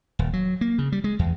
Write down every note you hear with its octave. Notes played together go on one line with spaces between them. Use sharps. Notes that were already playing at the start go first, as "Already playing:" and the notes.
D#1
F#3
A#3
C#3
G3
G#3
E2